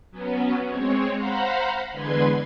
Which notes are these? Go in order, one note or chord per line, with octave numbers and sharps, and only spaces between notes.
F#3 B3 C#4
G#3 C4 C#5
C5 F5 F#5 A#5 B5
E2 D3 G#3 B4 C6 G#6